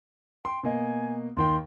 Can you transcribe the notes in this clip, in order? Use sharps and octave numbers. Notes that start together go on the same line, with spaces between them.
G5 C6
B2 A#3 D#5 G#5
D#2 D#3 G5 C6